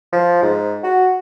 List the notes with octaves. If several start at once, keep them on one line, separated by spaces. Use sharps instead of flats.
F3
G#2
F#4